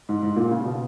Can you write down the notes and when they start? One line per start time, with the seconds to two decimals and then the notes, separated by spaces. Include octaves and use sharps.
0.09 G#2
0.23 G#2
0.36 A#2
0.51 C#3
0.65 B2